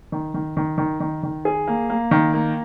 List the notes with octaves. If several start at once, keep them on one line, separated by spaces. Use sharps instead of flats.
D#3
D#3
D#3
D#3
D#3
D#3
G#4
A#3
A#3
D#3
A#3